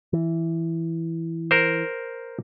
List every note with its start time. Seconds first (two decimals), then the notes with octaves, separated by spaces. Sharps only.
0.13 E3
1.51 A#4 C5